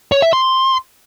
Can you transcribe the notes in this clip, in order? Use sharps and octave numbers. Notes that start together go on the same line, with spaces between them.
C#5
E5
C6